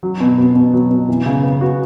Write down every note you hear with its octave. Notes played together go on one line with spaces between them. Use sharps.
F#3
B2
B3
B2
F#3
B2
E3
C#3
B3
F#4